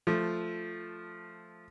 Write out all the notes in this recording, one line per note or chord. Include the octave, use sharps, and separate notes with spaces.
F3 A3